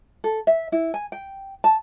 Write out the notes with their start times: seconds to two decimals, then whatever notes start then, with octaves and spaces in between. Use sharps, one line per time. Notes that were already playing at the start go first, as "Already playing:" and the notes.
0.24 A4
0.47 E5
0.72 E4
0.94 G#5
1.12 G5
1.64 A5